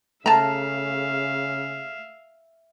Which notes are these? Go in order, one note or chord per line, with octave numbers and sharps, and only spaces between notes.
C#3 A3 E5 F5 A5 A#5